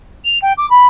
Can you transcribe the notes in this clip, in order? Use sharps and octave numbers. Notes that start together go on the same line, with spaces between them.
F7
G5
D6
B5